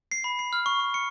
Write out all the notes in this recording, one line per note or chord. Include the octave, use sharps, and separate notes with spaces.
C7
B5
C7
F6
C#6
C#6
C#7